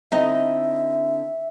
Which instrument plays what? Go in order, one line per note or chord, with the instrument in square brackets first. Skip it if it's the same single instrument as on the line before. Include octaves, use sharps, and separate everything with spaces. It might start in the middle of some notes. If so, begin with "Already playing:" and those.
[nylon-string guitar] D3 C4 E4 [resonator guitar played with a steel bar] D#4 D#5 [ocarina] E5